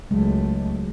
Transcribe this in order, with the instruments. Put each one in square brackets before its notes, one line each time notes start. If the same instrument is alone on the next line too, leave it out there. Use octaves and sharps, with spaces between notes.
[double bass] C#2 A3 [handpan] F#3 G#3